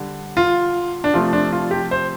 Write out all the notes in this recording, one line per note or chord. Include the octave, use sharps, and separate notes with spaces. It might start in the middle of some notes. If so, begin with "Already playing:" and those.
Already playing: D3 G3
F4
D4
C3 F3 A3 F4
D4
F4
G4
C5